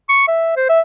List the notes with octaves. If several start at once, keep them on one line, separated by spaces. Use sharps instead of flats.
C#6
E5
C5
E5